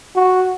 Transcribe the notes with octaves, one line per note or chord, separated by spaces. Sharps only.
F#4